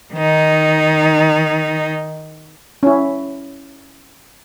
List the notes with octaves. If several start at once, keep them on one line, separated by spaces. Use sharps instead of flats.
D#3 D#4
C#4 E4